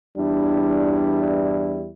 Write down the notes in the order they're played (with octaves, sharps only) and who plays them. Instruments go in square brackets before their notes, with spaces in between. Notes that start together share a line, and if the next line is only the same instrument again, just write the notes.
[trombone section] E2 G3 E4 [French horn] D4